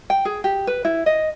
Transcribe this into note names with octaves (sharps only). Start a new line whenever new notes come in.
G5
G#4
G4
B4
E4
D#5